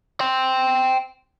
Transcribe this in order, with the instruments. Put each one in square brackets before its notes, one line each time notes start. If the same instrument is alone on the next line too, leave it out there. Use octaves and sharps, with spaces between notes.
[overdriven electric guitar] G5 C6